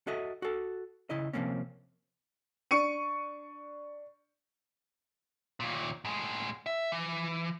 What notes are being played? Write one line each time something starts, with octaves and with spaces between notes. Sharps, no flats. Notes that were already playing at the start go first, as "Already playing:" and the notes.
F#4 A4 D#5 E5
F#4 A4
C#3 E4 D#5
C3 F3 A#3 C4 C#4
D4 C#6 C#7 D#7
D#2 A#2
A2 G#3
E5
E3